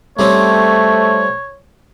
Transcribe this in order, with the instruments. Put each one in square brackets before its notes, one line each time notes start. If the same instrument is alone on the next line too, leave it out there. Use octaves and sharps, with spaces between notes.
[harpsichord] G3 C4 C#4 [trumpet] A3 [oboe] C#5